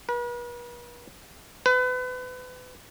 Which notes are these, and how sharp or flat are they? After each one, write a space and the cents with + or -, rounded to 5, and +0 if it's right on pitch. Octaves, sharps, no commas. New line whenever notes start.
B4 -40
B4 +35